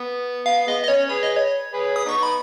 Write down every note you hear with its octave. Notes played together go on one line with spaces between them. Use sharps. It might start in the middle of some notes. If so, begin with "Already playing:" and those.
Already playing: B3
B3 F5
G#3 B3 D#5
D#5
C#4 C#5
G#4 B4 C#5
D#5
C#5
G#4 B4
D#6
B3 D#4 C#6
B5